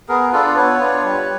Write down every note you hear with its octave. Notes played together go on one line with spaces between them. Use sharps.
B3 G#4 A#4
D4 F4 A4 B4
B3 B4 C#5
D4 F4
G3